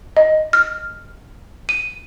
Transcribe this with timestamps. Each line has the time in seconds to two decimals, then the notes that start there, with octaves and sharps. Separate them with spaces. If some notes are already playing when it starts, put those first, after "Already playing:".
0.17 D#5
0.53 F6
1.69 D#7